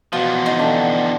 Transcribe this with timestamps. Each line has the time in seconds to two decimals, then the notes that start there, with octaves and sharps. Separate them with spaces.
0.13 E2 B2 F3 F5
0.46 D#4 F5 F#5
0.59 D3 D5 G5 A5